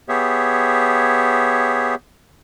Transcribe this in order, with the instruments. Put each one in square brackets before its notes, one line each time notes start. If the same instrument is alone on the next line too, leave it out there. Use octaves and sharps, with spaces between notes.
[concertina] B3 G4 G#4 C#5 E5